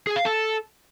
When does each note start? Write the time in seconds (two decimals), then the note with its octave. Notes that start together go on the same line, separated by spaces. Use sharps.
0.07 G#4
0.16 F5
0.25 A4